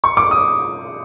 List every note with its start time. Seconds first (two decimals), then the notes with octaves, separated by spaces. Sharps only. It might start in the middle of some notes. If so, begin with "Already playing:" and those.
0.04 C#6
0.17 D6
0.31 D#6